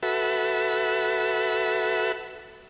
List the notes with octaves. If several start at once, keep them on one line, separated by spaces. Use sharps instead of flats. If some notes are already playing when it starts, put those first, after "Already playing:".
F#4 A4 B4 E5